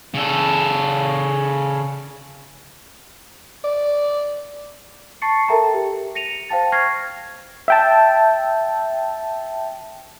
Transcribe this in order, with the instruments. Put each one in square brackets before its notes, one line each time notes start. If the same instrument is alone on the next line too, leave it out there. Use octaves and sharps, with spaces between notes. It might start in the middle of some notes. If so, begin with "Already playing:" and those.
[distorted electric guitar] C#3 A4
[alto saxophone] D5
[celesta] A5 C#6 A6 C7 C#7
A4 A#4 E5 G5 A5 A#5
G4
A#6 C#7 D#7 F7
C5 F5 G5 A5 A6
C#6 F6 G#6 A#6 C7
[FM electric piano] E5 G5 A5